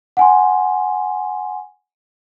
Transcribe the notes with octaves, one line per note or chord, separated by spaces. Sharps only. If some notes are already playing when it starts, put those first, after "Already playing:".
F#5 G#5 C6